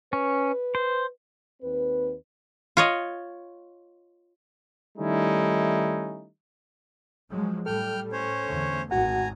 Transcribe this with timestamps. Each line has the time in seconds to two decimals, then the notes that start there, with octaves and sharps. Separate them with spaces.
0.13 C#4 B4
0.75 C5
1.62 D#2 C4 B4
2.77 F4 C#5 D#5
4.98 D#3 G3 A3 C#4 D#4 E4
7.29 F3 F#3 G#3
7.66 A2 G3 A4 G5 F6
8.12 C#4 C5 C#5
8.45 E2 D3 A3
8.91 G#1 F#4 F#5 G#5 A#5